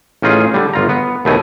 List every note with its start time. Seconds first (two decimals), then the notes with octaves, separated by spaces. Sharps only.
0.22 A1 C#4 D#4 F4 G#4
0.54 D3 G3
0.73 G1 F4 A#5
0.89 B3
1.25 D#2 B2 A3 G#5